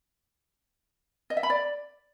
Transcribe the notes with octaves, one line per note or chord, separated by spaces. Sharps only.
D#5
E5
B5
D5